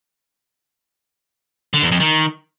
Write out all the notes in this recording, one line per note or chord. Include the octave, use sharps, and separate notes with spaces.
D3
E2
F2
D#3